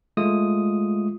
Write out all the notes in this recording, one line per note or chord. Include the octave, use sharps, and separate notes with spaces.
G#3 A3 F4 D#6